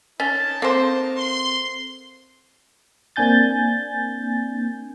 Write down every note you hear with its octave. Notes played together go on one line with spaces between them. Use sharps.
C#4 D#4 A#4 A5 A6
A#3 C4 A4 C5 C7
C6
A#3 C4 D4 G#5 G6 A6